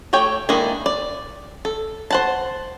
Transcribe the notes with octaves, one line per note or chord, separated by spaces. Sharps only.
A3 G4 C#5 G5
D#3 G#3 A#3 D4 E4
D5
A4
C5 F#5 A5